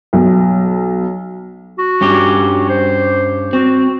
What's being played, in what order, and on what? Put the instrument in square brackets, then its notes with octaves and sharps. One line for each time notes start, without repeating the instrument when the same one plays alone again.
[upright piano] B1
[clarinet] F#4
[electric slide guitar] G2 C#4 G4
[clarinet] F#4
C5
[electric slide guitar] C4 [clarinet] F#4